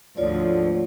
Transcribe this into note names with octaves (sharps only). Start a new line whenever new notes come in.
D2 G#2 F3 F4 C#5 D5